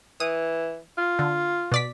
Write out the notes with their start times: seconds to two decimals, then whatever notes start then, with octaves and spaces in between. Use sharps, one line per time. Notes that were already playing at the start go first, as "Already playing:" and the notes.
0.20 E3 D#6
0.98 F4
1.19 D3
1.72 B2 D5 B6